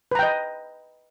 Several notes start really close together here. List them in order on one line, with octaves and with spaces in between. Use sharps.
B4 A#5 G5 D#5